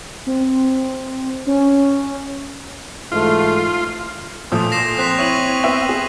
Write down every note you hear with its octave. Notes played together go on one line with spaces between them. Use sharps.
C4
C#4
G#2 E3 A3 F4
A#2 F3 A3 D#6
A#6 C7 E7
C4 F#6 B6 F7
E4 C#5 C#6 D#7 F#7
B3 E5 G5
G#4